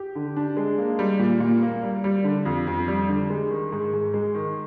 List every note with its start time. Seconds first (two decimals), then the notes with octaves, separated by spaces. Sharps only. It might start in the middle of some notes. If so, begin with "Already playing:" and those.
Already playing: G4
0.15 D3
0.36 D4
0.57 G#3
0.78 A#3
0.99 G3
1.19 A#2
1.40 A#2
1.62 A#3
1.83 G3
2.04 G3
2.24 D3
2.45 F2
2.67 F2
2.88 G3
3.09 D3
3.30 G#3
3.51 D#3
3.72 G#2
3.93 G#2
4.14 G#3
4.35 D#3